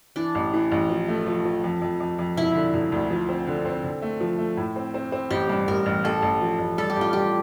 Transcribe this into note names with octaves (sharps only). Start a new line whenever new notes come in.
E3 D4
A1
E3
A1
F3
A3
F3
F3
F2
F2
F2
F2
E1 E4
D3
E1
D2
F3
C4
D3
C4
D3
A3
F3
A3
A2
C4
C4
C4
A1 G4
G2
A1 A#4
A1
A1 A4
A1
F3
A1
G3 A4
G4
A1 F4
G3 G4